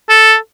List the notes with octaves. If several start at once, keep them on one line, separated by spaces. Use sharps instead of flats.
A4